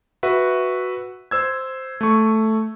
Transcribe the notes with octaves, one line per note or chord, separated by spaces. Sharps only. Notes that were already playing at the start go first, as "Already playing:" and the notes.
F#4 B4 E5 F#5
C5 E6 G#6
A3 C#6